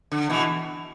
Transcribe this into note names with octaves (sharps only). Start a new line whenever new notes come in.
D3
B2 E3